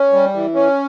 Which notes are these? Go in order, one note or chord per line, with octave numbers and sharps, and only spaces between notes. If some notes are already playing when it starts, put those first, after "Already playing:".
Already playing: C#4
G3
E3
C#4